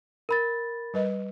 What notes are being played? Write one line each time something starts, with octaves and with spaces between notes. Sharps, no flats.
A#4 B5 A6
G3 B4 D#5